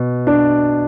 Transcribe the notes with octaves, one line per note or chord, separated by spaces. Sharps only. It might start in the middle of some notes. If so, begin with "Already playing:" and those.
Already playing: B2
D4